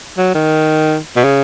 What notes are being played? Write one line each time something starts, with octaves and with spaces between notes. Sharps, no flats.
F#3
D#3
B2
C#3